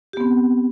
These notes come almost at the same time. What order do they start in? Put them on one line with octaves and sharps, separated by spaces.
G4 B3 C4